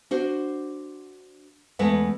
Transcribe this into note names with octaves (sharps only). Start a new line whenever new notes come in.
D4 F#4 C5
E2 G#3 A3 B4 F#5